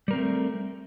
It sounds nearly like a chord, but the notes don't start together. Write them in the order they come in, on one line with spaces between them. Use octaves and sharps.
G3 A#4 C4 A3